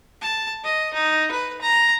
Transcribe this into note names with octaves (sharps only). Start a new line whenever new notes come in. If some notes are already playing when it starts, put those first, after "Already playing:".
A5
D#5
D#4
B4
A#5